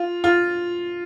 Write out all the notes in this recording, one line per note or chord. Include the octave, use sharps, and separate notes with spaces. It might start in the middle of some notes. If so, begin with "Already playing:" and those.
Already playing: F4
F4